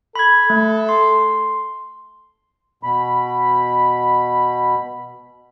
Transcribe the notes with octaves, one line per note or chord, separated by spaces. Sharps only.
A4 B5 G#6
A3
C6
B2 B5